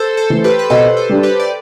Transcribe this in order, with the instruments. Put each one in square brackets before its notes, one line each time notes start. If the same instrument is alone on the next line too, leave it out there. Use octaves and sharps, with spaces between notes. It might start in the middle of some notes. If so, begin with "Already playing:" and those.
Already playing: [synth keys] A4 C5
A4 C5
[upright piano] E3 A3
[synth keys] G4 B4
B4
[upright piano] B2 [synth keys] A4 C5
[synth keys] A4 C5
[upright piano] G3 D4
[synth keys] G4 B4
D5